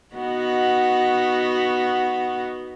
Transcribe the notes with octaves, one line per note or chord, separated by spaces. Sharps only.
B3 D#4 F#4